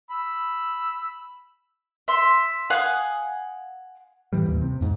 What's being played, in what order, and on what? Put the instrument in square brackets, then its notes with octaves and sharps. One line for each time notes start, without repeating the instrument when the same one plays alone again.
[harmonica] B5 E6
[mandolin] E5 C6
F5 F#5 G#5 D#6
[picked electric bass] A2 E3 G3
A1 D#2
C3
F2 G#2